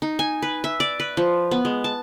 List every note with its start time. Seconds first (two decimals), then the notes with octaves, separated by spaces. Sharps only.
0.02 D#4
0.19 G#5
0.42 B4
0.64 E5
0.80 D5
1.00 B4
1.17 F3
1.51 B3
1.65 G#3
1.84 A5